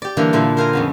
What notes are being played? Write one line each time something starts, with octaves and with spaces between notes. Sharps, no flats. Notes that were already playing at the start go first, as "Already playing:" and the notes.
G4 D5
D3 E3 G3 A#3 D4
A#2 D3 E4 A4
A#4 C5 F5 G5 G#5 A#5
F2 C#3 B3